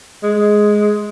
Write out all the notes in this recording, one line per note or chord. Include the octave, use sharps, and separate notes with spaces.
G#3